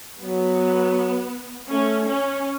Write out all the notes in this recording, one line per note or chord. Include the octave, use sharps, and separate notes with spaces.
F#3 B3
A3 C#4
C#4